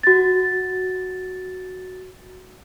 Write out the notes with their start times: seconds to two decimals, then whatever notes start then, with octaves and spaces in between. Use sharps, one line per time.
0.03 F#4 A6